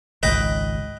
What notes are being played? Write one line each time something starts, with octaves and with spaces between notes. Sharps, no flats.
G#1 C#2 G#2 B4 D#5 G5